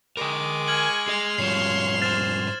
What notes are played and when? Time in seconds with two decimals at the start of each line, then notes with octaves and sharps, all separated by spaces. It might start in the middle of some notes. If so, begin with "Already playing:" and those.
0.17 G#3 A#4 G5 D6
0.68 G#5 C#6 F6 G#6 F#7
1.08 G#4 D#5 C6 F7
1.38 G#2 F3 G3 C#5 F5 C7 E7
2.01 C5 F6 A6 E7